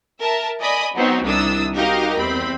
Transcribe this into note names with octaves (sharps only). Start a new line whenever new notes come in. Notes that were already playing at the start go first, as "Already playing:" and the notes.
A#4 E5 A5
D5 D#5 G#5 B5 D#6
F#3 B3 C4 D#4
C2 D#3 D4 E4 D#6 E6
D#4 F#4 G4 A#4 D#5 F5
E2 C4 B5